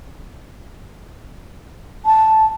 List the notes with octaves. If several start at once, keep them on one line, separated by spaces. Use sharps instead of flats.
A5